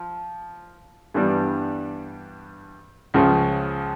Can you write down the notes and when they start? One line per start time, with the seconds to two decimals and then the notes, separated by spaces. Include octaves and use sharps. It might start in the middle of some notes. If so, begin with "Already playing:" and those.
Already playing: F3
1.14 G2 E3 G3 B3 D4
3.14 C#2 C#3 F3